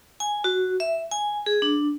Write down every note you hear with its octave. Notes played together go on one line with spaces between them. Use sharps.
G#5
F#4
E5
G#5
G#4
D4